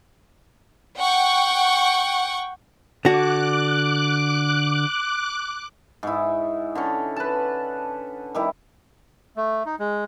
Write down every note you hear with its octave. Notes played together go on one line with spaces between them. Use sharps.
F#5 G5 C#6
D3 F#4 D6 F#6
G#2 E4
D3 C#4
B4 A5
D#3 G3 E4
A3
D#4
G#3